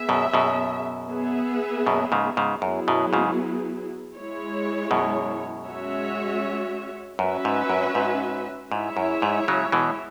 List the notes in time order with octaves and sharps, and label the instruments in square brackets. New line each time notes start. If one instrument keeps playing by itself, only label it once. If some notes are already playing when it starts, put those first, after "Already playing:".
Already playing: [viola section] B3 G#4 E5
[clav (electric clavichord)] F#2 B2
F#2 B2
[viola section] B3 G#4 E5
[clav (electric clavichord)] F#2 B2
G#2 C#3
G#2 C#3
[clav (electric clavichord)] F#2 [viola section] F#3 B3 E4 G#4
[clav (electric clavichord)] F#2 B2
G#2 C#3
[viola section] G#3 E4 C#5
[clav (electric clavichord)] F#2 B2
[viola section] G#3 C#4 F#4 C#5 E5
[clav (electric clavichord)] F#2 [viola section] C#4 F#4 B4 E5
[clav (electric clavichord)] G#2
F#2
G#2
[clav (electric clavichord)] G#2 [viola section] G#3 E4 C#5 E5
[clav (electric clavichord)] F#2
G#2
C#3 F#3
B2 E3